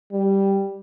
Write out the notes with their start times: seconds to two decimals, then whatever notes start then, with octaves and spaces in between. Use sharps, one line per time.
0.12 G3